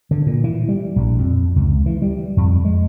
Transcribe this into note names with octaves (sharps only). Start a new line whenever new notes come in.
D3
A#2
E3
G3
A#1
F2
C#2
E3
G3
F2
G#3